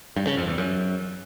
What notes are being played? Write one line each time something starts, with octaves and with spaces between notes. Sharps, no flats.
G2
C#3
F2
E2
F#2